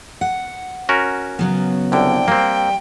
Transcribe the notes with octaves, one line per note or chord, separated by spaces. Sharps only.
F#5
C#4 F#4 A#4
C#3 F#3 B3
C2 D3 G5
G3 A#3 C4